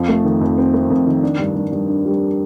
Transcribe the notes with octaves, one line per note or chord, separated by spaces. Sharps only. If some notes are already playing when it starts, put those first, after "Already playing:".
Already playing: F2 F3
A3
D#3
F2
C4
A3
F2
D#3
D4
G2
G2
G2
D4
G3